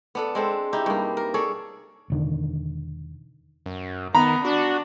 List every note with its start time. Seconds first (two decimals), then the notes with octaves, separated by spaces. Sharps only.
0.15 B3 D4 A4
0.35 G#3 C4 A4
0.73 D#4 E4 G4
0.86 G2 A#3
1.17 A#4
1.34 G#4 A4 C#5 D5
2.10 E1 D3 D#3
3.66 F#2
4.15 D#3 B3 A#5 B5
4.45 D4 F#4